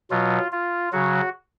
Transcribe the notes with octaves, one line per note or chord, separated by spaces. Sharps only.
B2 F#3 F4
F4
C#3 F#3 F#4